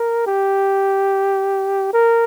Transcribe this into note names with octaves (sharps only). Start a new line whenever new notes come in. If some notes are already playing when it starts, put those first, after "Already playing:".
Already playing: A#4
G4
A#4